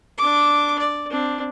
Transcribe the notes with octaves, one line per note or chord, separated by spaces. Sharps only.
D4 D6
D5
C4 D4